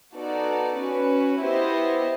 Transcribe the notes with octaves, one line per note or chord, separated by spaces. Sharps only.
B3 D#4 F#4 A4 D5
C#4 F#4 B4
B3 E4 G4 C5 D#5